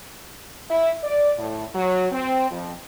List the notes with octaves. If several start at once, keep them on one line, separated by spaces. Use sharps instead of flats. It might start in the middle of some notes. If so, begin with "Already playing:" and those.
E4
D5
A2
F#3
C4
F2